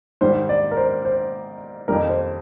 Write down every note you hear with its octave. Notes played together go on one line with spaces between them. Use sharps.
G#2 D#3 G3 C5
D5
A#4
C5
C5
F2 D#3 G3 A#4
C5